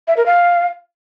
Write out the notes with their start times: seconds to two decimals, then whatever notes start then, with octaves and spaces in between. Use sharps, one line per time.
0.08 E5
0.17 A#4
0.26 F5